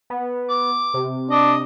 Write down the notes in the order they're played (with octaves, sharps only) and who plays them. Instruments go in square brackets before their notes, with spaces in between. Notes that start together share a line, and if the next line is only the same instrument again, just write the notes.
[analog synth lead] B3
[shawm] D6
[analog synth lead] C3
[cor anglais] D4 [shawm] D#5